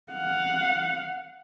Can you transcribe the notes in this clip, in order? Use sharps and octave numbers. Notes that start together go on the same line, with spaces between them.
F5 F#5